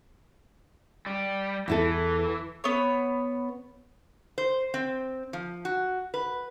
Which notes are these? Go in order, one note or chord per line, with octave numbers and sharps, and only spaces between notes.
G3
E2 E3 E4 A4
B3 C#5
C5
C4
F3
F#4
B4